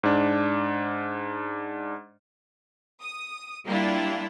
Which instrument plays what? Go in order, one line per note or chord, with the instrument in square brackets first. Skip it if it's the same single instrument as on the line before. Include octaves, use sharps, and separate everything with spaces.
[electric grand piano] G#2 D4
[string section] D#6
G3 A#3 D4 E4 F4 G4